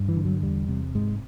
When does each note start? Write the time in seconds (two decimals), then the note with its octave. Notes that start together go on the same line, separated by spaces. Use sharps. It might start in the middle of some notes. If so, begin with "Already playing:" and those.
Already playing: G2
0.09 E3
0.16 D3
0.25 F#3
0.42 E2 G3
0.69 C3
0.95 G#2 G#3